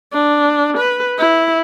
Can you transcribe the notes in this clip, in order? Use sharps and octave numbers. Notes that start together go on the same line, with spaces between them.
D4
B4
E4